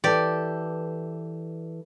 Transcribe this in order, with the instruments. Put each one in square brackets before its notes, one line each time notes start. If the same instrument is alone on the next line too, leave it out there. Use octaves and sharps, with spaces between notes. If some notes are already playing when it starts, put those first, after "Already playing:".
[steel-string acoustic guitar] E3 A4 [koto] G4 D5